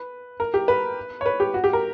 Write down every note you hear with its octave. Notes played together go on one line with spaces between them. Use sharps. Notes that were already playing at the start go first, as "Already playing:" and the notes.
Already playing: B4
A#4
G4
B4
C#5
B4
G4
F#4
G4
A#4